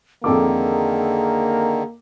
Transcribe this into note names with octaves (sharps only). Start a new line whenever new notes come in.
F2 D3 D#3 A#3 G#4 A4 D6